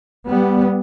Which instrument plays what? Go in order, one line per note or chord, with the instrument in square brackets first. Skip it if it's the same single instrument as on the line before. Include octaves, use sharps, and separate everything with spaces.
[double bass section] G3 B3